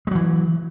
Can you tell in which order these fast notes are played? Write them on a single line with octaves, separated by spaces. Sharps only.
G#3 F#3 E3